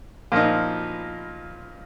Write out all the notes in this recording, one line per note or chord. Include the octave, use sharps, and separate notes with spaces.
A#2 F3 D#4